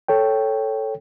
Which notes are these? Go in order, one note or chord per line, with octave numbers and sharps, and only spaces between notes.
A4 C#5 G5